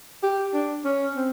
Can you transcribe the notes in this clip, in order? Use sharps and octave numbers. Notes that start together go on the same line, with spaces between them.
G4
D4
C#4
C4